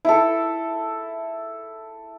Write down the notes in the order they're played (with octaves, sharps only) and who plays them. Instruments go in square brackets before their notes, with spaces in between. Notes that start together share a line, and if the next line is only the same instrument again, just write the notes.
[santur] E4 A4